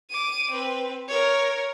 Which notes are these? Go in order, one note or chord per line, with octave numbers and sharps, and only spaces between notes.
D6 D#7
C4 B4
A#4 C#5